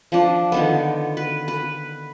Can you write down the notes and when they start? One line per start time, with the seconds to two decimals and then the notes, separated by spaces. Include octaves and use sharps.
0.12 F3 D4
0.52 D3 D#3 B3
1.17 B4
1.48 B4